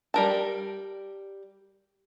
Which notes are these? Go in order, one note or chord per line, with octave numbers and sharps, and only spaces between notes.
G3 A#4 A5